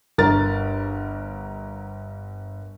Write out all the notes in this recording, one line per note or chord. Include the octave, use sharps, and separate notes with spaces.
G1 A#4 A6